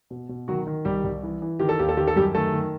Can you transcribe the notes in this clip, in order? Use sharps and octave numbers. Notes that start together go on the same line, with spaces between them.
B2
B2
D#3 F#3 F#4
D#3
C2 G3 G4
C2
E3
E3
D#3 G4
A4
D#2 G4
A4
D#3 G4
A4
F#2 G3 G4
D#3 A3 A4
D#3